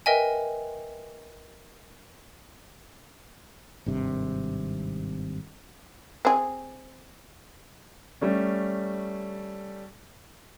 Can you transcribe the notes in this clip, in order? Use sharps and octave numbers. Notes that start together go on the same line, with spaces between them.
A#4 B4 D#5 E5 G5 G#5
G#1 G2 C3
C4 G#4
G3 A3 C#4